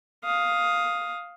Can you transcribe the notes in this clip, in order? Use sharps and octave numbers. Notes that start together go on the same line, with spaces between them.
F5 D#6